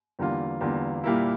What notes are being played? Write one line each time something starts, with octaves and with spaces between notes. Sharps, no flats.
E2 D3 G3 A#3 F4
E2 D3 G3 A#3 F4
A#2 G3 A#3 E4